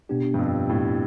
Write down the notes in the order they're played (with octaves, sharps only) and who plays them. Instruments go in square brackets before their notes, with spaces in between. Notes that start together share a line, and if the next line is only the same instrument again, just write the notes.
[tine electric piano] B2 B3 D4 G4
[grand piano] G2
F2
A2